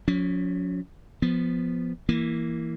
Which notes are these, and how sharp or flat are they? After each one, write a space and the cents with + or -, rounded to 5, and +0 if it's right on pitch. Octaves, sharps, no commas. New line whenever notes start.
F#3 -45 C#4 +30
F3 +0 B3 +0
E3 +0 A#3 +0